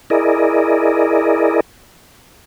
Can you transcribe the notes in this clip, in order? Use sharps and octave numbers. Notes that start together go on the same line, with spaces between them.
E4 G#4 A#4 D5 D#5